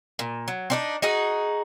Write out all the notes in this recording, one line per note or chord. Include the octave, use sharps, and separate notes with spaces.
A#2
F#3
C4 D4 D#4
D#4 F#4 G#4